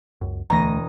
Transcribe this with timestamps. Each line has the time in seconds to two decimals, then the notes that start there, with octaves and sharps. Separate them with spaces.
0.21 C#2 F#2
0.50 E1 D2 A3 D#5 A#5 A#6